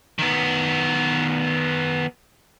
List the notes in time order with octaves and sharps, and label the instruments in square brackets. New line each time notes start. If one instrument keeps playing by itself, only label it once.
[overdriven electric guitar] D#3 B3